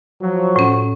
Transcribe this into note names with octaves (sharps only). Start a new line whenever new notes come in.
F3 F#3
A2 C#4